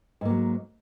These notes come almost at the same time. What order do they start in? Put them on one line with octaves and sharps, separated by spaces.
G#2 A#3 F#3